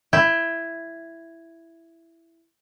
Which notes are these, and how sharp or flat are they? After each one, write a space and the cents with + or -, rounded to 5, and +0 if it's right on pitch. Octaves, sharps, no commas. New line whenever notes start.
E4 +10 G5 +20